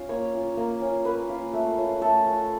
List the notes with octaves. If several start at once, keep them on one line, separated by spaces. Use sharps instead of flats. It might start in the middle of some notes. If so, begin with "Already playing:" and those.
Already playing: C#4 F4
A#3 C#5
C#4 F4
A#3
C#4 F4
A#3 B4
C#4 F4
A3
C#4 F4
A3 A4
C#4 F4